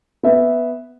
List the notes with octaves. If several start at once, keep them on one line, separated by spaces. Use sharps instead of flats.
B3 E5